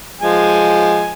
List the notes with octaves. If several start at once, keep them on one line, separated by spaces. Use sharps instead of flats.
F3 G#3 G#5